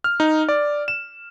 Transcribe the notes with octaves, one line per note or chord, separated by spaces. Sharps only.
F6
D#4
D5
E7